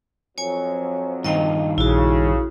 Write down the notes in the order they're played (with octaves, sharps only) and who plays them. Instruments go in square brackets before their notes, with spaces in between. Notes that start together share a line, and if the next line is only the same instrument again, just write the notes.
[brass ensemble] F2 F3 F#3 [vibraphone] C#5 G#5
[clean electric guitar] G2 D#3 F4 [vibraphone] D#5 G5
[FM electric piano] A#1 [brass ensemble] C#3 [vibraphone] E4 F#4